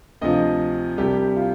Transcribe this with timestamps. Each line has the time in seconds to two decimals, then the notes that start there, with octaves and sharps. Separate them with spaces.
0.21 D2 C3 F3 D#5
0.98 C2 C3 G3 G4
1.36 F4